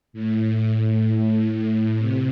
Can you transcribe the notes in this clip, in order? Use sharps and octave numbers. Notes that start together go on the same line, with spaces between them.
A2
A2
C3